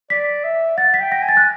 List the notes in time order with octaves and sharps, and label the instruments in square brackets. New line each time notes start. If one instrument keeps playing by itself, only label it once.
[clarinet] D5 [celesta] B6
[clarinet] E5
[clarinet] F#5 [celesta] A6
[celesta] B6
[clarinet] G5
[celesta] A#6
[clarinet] G#5
[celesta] A6
F#6